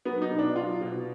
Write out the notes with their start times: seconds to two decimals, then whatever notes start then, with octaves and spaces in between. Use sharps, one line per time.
0.05 F#3 B3
0.22 D#4
0.31 B2
0.38 D4
0.56 F#3 F4
0.81 B2